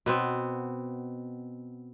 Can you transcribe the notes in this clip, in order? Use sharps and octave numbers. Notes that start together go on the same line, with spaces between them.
B2 B3 C4